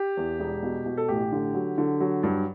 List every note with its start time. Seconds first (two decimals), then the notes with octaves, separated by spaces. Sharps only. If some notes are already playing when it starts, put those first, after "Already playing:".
Already playing: G4
0.17 E2
0.40 E1
0.63 B2
0.86 B2
0.97 A4
1.08 A1 G4
1.32 D3
1.54 F#3
1.78 D3
2.00 F#3
2.23 G2